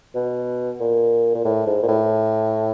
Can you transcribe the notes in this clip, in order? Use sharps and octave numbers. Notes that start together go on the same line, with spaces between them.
B2
A#2
A#2
A2
G#2
A#2
A2